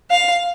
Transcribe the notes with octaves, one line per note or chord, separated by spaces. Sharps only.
F5